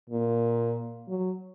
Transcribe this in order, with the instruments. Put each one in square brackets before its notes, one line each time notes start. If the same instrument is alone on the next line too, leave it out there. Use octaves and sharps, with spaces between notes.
[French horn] A#2
F#3